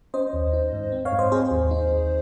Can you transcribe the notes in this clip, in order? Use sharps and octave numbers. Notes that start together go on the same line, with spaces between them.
C#4 C5 D#5
D#2
D#4
G#2
C4
C#5 F5
G#2
C5 D#5
C4 G#4 C5
D#2
D#4
D#2